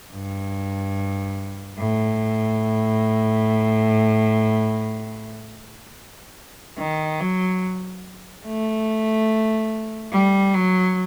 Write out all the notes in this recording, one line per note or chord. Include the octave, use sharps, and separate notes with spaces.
G2
A2
D#3
F#3
A3
G3
F#3